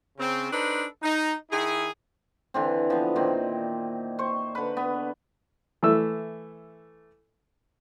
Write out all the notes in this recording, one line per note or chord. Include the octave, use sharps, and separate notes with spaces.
C#3 C4
D4 D#4 A4 B4 C5
D#4
D#3 E4 G#4
D3 E3 C4
F3 B3
A#2 D#3 C4
C5 C#6
D3 B4
B3
E3 A3 E6